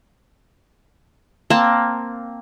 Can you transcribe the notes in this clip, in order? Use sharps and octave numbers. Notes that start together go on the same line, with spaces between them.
A#3 C4 A5